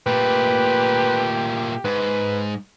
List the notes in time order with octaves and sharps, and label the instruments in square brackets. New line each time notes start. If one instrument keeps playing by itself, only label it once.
[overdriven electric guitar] A#2 A3 [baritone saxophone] G4 [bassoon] B4
[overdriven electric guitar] G#2 [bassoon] B4